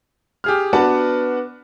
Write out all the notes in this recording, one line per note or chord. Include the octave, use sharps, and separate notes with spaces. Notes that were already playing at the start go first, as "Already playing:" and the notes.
G4 G#4 F6
B3 D4 F#4 B4 F#5 A5